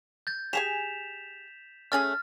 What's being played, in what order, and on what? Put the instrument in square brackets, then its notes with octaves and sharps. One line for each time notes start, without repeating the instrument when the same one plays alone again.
[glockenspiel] G6 A6
[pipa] G4 G#4 G#5 [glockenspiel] B6 E7 F7
[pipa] A3 C#4 G#4 [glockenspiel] F6 A6